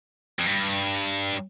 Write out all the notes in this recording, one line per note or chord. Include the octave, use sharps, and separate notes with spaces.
F2
G2